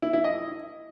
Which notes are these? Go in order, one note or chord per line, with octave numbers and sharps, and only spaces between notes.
E4
E4
D#5